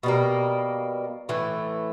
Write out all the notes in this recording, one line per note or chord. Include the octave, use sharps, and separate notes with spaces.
B2 G3 A#3
A2 E3 A3